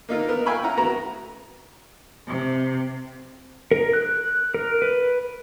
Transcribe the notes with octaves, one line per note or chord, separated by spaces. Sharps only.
A#3 D#4 F4 A#4
B3 A#4
F5 G5 G#5 B5 C#6 E6
C#4 E4 F#5 A#5
A3 B3 F#4 A#5
C3
A#4
F#6
A#4
B4